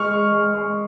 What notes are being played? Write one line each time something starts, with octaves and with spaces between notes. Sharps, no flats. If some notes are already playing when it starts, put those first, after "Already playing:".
Already playing: G#3 C#6 F6
G#3
G#3
G#3